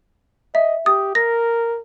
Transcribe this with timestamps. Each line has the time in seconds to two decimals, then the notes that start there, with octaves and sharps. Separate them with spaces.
0.55 D#5 E5
0.86 G4 D#6
1.15 A#4 A#6